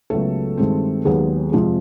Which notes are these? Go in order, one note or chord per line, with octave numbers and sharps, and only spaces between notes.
C#2 C#3 F#3 A3 B3 A4
G2 D#3 G#3 C4
D#2 D#3 F#3 G#3 B3 G#4
F2 C3 F3 G#3